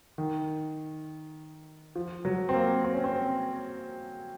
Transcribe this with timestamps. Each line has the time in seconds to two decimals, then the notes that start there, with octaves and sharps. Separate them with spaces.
0.18 D#3
1.96 F3
2.25 F#3
2.49 C4
2.54 A#3
2.85 C4
2.94 C#4
3.04 C4